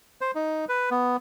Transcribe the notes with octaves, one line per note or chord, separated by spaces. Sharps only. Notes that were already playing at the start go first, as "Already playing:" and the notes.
C5
D#4
B4
B3